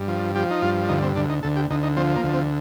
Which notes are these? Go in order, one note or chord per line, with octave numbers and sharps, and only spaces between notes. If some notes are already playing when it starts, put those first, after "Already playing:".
Already playing: G2
F3
F3 G4
D#4
G2 F4
D2 D#4
C4
D2 D4
D#4
D2 A4
G4
D2 D#4
D#4
F3 C4
A#3
D2
C4